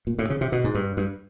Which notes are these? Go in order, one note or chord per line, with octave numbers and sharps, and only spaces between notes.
A#2
A2
C#3
C3
B2
G#2
G2
G2